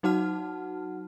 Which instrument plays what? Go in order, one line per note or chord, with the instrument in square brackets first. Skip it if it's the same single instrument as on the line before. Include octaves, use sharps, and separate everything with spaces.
[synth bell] F#3 D#4 F#4 F#5 A5 F6